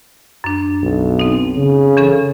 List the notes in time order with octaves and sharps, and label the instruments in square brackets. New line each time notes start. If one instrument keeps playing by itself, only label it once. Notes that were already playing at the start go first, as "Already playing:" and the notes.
[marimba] F#2 D4
[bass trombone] B1
[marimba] C4 D#4
[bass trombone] C#3
[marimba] E3 C#4 A4